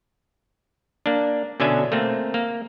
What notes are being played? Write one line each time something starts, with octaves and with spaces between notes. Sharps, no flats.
A#3 D4
B2 D3 C#4 D4 E5 G#5
A3 A#3 C4
A#3